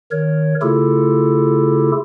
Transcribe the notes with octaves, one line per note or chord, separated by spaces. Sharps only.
D#3 A#4 C#5
C#3 A3 E4 F4 G4 A4